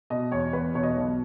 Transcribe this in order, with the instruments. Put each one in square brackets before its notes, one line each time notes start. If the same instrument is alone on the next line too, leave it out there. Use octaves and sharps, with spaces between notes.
[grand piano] B2 D#5
E2 C#5
E2 B4
B2 C#5
D#5
C#5
B1